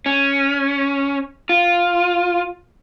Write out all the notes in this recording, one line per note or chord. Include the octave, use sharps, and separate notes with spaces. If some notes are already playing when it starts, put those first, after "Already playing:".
C#4
F4